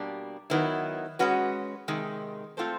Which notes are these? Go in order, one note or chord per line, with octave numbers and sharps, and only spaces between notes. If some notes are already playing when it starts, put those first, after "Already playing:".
Already playing: B2 G3 A#3 D4
D#3 F#3 B3 E4
G#3 C#4 F#4 B4
C3 D#3 G#3
A3 C4 F4 A4 C5